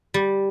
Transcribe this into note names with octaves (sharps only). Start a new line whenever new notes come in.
G3